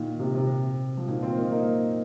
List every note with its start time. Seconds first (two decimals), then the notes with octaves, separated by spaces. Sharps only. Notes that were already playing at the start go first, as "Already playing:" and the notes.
Already playing: A#2 D#3
0.19 C3
0.35 C3
0.97 F3
1.08 A#2 D#3
1.22 C4 F4
1.37 A#3 D#4
1.52 A#3 D#4